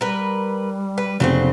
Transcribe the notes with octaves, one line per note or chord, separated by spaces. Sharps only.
G3 A#4 B4
B4
F1 C#3 F#3 B3 C4